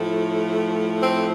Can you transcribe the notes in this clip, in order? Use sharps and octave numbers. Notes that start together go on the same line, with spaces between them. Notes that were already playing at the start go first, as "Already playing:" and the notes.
Already playing: A2 F3 A3
C4